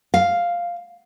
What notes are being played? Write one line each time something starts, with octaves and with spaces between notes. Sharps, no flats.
F5